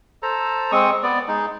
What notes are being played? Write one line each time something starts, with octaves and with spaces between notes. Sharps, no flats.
A4 C5 A#5
G#3 C4 C#6 D#6
B3 D5
G#3 D#4